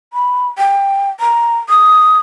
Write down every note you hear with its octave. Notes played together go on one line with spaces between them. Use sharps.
B5
G5
A#5
D#6